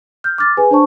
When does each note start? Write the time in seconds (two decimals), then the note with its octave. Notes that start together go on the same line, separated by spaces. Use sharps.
0.24 F6 G6
0.38 D6 F6 A6
0.57 G#4 B4 G#5
0.71 D4 C5 D5 A5 C#6